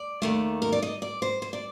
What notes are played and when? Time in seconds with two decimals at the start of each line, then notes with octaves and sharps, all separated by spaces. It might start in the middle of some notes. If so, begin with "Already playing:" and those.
Already playing: D5
0.22 D#2 D#3 A3
0.62 A#4
0.72 D5
0.82 D#5
1.02 D5
1.22 C5
1.42 C5
1.53 D5